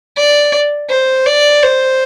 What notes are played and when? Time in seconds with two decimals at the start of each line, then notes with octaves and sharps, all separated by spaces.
0.17 D5
0.90 C5
1.26 D5
1.63 C5